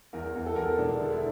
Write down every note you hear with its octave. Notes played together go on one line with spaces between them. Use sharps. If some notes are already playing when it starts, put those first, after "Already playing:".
E2 A#4
E2
A4
E2 A#4
A4
E1 D4
D3
E4